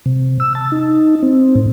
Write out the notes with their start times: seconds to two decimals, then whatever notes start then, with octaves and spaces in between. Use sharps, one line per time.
0.06 C3
0.40 E6
0.55 A5
0.72 D#4
1.23 C4
1.55 A2